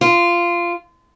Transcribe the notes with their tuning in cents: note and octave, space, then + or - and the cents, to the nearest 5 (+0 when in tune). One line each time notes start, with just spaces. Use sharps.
F4 -15